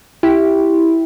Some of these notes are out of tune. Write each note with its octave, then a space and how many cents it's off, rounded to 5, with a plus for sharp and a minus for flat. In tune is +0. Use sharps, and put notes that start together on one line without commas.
E4 -5 G4 +0